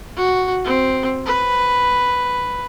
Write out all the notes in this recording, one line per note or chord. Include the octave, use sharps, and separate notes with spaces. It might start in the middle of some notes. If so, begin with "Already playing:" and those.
F#4
C4
B4